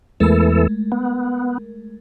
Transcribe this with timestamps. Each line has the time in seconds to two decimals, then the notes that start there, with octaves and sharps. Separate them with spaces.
0.20 E2 E3 G#3 A3 A4 A#4
0.92 B3